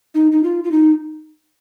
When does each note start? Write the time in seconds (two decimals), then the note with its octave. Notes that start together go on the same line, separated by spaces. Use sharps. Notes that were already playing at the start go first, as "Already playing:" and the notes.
0.15 D#4
0.32 D#4
0.43 F4
0.64 F4
0.71 D#4